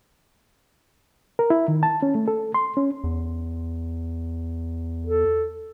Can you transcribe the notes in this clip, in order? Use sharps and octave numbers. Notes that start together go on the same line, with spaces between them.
A#4
E4
D#3
A5
C#4
A3
A4
C6
C#4
E2
A4